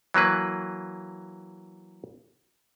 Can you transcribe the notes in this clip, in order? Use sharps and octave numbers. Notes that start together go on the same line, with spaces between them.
E3 F#3 A#3 B4